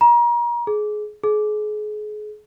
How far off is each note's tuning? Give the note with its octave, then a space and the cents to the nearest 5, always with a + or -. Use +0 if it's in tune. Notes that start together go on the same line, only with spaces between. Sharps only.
A#5 +35
G#4 +25
G#4 +35